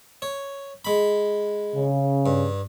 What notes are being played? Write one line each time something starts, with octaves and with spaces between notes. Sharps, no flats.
C#5
G#3 B5
C#3
G2